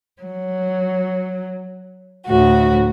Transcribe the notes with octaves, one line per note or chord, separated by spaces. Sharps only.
F#3
D2 A2 F#4